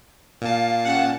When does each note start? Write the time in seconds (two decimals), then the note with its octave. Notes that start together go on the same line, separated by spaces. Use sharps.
0.42 A#2 F5 A5
0.85 C#4 G4 F#5